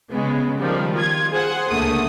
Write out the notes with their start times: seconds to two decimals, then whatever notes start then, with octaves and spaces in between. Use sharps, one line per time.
0.12 C#3 G#3 B3
0.59 D#3 F3 G3
0.94 F4 G#6
1.30 G#4 C5 F#5
1.70 C#2 D3 A3 A#3 D#6